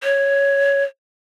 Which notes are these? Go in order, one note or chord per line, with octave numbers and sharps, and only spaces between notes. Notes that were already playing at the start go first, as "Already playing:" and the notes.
C#5